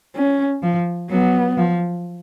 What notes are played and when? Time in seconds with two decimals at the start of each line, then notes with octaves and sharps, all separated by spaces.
0.16 C#4
0.63 F3
1.11 F#3 B3
1.57 F3